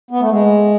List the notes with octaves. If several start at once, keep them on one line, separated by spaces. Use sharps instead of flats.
B3
A3
G#3